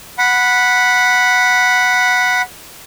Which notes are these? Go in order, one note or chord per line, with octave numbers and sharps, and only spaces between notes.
F#5 B5